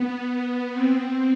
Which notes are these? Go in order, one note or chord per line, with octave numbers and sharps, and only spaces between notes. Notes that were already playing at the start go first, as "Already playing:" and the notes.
Already playing: B3
C4